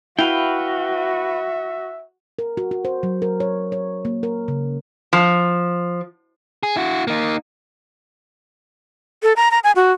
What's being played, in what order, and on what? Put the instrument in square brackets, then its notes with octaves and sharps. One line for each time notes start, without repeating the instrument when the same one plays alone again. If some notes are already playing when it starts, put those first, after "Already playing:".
[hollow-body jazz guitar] E4 [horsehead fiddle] F#4 [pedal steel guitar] B4 F5 G5 [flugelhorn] E5
[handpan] A#4
F#4
F#4
C5
F#3
A#4
C#5
C#5
A#3
A#4
C#3
[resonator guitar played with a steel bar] F3
[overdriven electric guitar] G#4
E4 F#4
A#3 D#4
[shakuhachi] A4
A#5
A#5
G#5
F#4